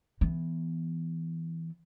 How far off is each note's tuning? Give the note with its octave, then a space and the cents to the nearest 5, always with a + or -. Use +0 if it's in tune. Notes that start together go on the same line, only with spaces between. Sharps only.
E3 +0 B3 +0